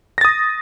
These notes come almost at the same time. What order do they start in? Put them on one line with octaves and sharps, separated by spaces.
A#6 A6 D#6